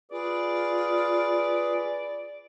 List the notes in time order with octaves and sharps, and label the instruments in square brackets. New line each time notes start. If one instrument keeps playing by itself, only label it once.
[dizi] F4 [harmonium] G#4 B4 [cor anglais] D5